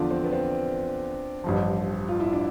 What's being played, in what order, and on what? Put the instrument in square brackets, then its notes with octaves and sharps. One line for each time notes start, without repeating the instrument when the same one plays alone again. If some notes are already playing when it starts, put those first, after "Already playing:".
Already playing: [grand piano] E2 D3 F3 [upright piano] D4 F4
[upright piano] C4
B3
C4
[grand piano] A1 G2 F3
[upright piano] F4
E4
D4